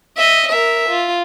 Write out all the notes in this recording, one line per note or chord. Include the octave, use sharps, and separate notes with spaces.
D#5 E5
A#4 E5
F4